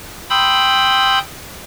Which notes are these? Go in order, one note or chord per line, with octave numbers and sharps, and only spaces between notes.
G5 B5 C6 D#6 E6 G6